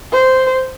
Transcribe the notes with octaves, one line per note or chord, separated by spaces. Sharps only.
C5